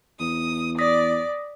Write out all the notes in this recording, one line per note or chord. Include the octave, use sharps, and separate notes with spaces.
E2 D#6
D5 D#6 A#6 B6